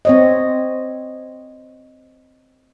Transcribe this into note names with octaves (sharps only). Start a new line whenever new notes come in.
C4 C#5 D#5